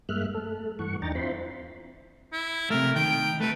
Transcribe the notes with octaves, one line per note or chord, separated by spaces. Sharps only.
G2 G#3 A#3 E5 F6 F#6
A3 A4
G2 E3 F#5 C#6
E2 D4 D#4 G5 A#5 A6
C4 E4 F4 C5 B5 C6
E4
C3 A3 A#4
D#3 G5
A3 A4 B4